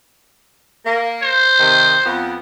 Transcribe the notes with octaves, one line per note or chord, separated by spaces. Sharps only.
A#3
C5
C3 D#3
F2 B3